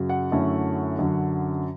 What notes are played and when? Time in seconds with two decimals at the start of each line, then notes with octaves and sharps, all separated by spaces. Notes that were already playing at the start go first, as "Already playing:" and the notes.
Already playing: F#2 C#3 F#3
0.09 F#5
0.32 F#2 D3 A3 C#4 E4
0.99 F#2 D3 F#3